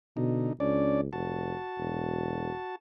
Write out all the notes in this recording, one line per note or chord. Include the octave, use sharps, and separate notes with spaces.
B2 D3 D#4
C#2 C#4 D4 D5
F1 F#4 A5
E1